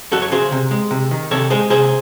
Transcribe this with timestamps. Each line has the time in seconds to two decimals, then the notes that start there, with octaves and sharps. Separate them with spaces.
0.12 F#2 F#4 A4
0.22 C#5
0.32 C#3 G#4 C5
0.52 C3
0.71 G#3
0.91 C3
1.11 D#3
1.31 C3 A4 C#5
1.50 G#3 G#4 C5
1.70 C3 G#4 C5